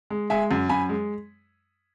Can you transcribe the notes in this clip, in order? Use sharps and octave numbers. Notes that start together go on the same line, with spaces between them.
G#3
G#3 E5 G#5
F#2
F#2 G#5 B5
G#3